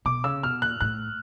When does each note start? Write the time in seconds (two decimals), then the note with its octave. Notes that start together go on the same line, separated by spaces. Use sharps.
0.05 B2 D6
0.24 C#3 E6
0.43 B2 F6
0.62 A#2 F#6
0.81 A2 F#6